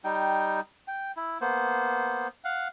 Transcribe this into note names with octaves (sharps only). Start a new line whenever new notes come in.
G3 D#4 G5
G5
E4
A#3 B3 C5
F5 F#5